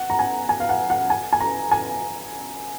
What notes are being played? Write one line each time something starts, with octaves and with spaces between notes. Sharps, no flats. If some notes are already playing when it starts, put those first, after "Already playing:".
Already playing: F#5
A#5
G#5
G#5
F5
F#5
F#5
G#5
G#5
A#5
G#5